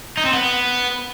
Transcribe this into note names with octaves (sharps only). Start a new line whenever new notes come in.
D#4
C4
B3